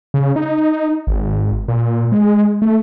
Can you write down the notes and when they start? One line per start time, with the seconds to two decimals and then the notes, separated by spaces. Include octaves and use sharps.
0.14 C#3
0.36 D#4
1.07 G#1
1.68 A#2
2.12 G#3
2.62 A3